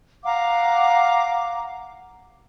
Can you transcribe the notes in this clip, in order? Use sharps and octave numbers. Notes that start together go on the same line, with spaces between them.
F5 F#5 A#5 D6